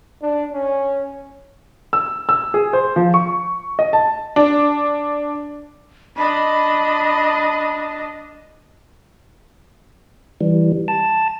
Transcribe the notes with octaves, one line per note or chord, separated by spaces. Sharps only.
D4
C#4
E6
E6
G#4
C5
F3
C#6
D#5
A5
D4
D4 D#5 B5
E3 G3
A5